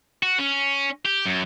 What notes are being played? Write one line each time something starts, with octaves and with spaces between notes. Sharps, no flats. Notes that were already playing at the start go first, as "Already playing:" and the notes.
F#4
C#4
G4
F#2